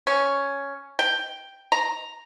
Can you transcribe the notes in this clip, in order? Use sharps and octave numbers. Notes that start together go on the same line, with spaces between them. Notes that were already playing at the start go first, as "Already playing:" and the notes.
C#4
G5
A#5